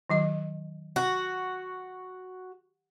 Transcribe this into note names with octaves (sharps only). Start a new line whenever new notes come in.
D#3 F#3 D#5
F#4